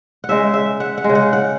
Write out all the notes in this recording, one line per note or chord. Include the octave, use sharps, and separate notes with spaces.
F#5
C#3 G#3 E5
E5
F#5
F#5
G#3
C#3
F#5
F#5